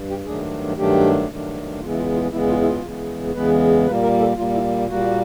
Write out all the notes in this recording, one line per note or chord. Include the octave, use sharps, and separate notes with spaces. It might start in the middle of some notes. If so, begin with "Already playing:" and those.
Already playing: G2
G4
G2 D#3 F#3 A3 D4 G#4
G2 D#3 F#3 A3 D4 G4
G2 D#3 F#3 A3 D4
E2 C#3 E3 G#3 B3 F4
E4
F4
F4
E2 C#3 E3 G#3 B3 E4
F4
E4
F4
E2 C#3 E3 G#3 B3
E2 C#3 E3 G#3 B3 B4
A#2 G3 A#3 B4
A#4
A4
A#2 G3 A#3 F4
E4
A#2 G3 A#3 F#4